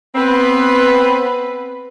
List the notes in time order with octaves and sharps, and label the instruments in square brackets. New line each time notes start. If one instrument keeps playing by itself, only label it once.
[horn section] B3 C4 [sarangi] B4